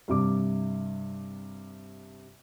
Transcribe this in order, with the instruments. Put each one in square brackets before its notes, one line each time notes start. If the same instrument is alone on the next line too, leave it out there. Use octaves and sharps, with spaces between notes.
[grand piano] G2 C3 D6